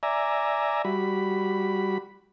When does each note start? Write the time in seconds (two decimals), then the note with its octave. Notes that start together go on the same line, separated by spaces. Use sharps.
0.03 D5 E5 G#5 A#5
0.85 G3 F#4 B5